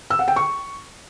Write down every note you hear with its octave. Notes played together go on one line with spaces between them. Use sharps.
E6
F#5
G5
C#6